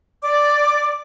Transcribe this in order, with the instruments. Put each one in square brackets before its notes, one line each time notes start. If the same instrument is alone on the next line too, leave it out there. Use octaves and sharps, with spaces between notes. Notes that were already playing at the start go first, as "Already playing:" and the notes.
[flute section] D5 D6